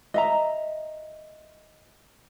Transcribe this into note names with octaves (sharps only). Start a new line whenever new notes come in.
D#5 E5 A#5